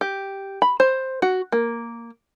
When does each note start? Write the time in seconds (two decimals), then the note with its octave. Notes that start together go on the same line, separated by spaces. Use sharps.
0.01 G4
0.62 B5
0.80 C5
1.22 F#4
1.52 A#3